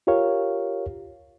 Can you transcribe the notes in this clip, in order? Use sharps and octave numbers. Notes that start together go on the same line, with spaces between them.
F4 G4 A#4 C#5 F5